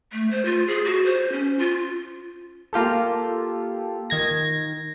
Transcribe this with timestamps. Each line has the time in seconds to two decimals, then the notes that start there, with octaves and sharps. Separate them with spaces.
0.13 A3
0.31 C5
0.45 F4
0.68 G#4
0.85 F#4
1.06 C5
1.32 C#4
1.59 F4
2.73 A#3 F4 G4 A4
4.10 D#3 G#6 A#6